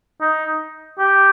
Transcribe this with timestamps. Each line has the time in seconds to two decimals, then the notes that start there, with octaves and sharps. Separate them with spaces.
0.21 D#4
0.99 G4